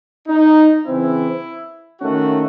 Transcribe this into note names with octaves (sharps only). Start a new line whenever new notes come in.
D#4
C#3 E3 C4 E4
D#3 A3 C#4 F#4